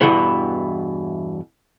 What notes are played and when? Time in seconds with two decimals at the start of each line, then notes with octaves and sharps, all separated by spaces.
0.01 E2 G2 B2 E3 B3